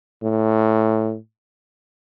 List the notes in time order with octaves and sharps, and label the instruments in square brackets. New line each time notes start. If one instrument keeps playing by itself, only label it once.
[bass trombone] A2